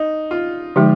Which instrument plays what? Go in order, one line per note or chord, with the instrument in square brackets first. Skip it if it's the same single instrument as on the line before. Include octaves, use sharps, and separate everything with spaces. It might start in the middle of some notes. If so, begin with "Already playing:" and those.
Already playing: [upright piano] D#4
F4
[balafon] D3 F3 G#3 D#4 [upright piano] G4